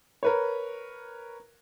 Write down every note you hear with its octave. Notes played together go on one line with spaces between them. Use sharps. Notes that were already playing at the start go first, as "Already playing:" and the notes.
A#4 B4 C#5